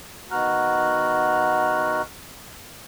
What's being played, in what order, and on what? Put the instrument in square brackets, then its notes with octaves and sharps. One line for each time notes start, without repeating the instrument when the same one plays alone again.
[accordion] D#3 B3 F#4 A#5 F6 F#6